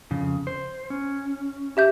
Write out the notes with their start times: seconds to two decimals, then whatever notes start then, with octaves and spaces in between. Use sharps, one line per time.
0.11 F2 C#3
0.47 C5
0.90 C#4
1.77 G4 E5 G6